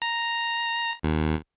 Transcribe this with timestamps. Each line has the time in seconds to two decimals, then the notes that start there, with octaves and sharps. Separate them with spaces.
0.02 A#5
1.03 D#2